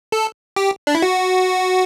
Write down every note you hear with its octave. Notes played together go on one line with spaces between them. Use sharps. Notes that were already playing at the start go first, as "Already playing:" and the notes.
A4
G4
D4
E4
F#4